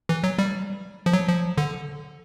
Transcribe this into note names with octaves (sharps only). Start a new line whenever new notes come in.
E3
F#3
G3
F3
F#3
F3
D3